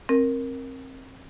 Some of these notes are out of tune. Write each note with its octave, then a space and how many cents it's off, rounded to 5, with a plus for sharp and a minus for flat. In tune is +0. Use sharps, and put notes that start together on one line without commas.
C4 +25 A#4 +0